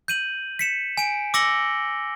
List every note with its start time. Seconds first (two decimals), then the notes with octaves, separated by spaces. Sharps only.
0.08 G6 D#7 F#7
0.59 B6 C#7 E7
0.97 G#5 D7
1.34 D6 E6 A#6 C#7 F#7 G7